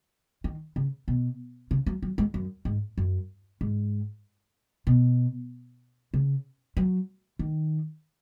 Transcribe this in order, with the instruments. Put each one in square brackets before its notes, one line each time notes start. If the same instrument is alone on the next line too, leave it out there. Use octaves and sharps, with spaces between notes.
[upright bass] D#3
C#3
B2
C#3
F#3
F#3
G#3
F#2
G#2
F#2
G#2
B2
C#3
F#3
D#3